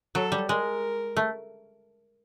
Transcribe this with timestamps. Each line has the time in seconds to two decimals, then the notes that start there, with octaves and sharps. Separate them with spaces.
0.15 F#3 A4
0.32 G3
0.49 G#3 A#4
1.17 A3